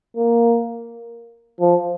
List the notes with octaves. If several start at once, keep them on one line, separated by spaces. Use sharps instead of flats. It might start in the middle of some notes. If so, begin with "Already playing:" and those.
A#3
F3